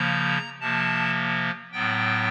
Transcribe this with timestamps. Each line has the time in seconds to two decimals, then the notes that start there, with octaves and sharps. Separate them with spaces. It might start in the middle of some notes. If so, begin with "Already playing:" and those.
Already playing: C#3 F3 A#3 A#5
0.61 C3 F3 A#3 A5
1.72 A2 F#3 B3 G5